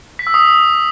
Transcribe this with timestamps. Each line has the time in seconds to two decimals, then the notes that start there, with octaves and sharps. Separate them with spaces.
0.19 B6
0.27 E6
0.34 D#6